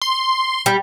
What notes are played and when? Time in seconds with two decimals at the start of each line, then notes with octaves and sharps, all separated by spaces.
0.02 C6
0.66 G3